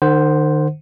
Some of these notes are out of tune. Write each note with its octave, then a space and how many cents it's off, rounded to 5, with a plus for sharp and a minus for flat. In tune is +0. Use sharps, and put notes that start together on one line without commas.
D#3 -40 C5 +0 F#5 +0